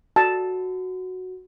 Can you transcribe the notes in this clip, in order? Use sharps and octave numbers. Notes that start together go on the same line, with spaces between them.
F#4 A5